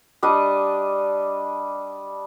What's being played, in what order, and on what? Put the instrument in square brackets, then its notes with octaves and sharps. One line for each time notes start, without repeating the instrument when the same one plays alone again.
[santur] G3 D4 D#5